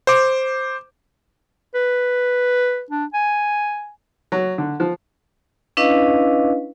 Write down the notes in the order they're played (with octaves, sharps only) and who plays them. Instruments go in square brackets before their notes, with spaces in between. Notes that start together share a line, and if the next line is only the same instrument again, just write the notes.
[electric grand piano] C5 D6
[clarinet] B4
D4
G#5
[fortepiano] F#3
D3
F3
[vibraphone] C#4 D4 E4 B4 D#5 F5